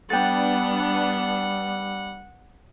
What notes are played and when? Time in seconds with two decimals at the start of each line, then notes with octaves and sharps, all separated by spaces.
0.10 G3 B3 D4 F#5 G5 A6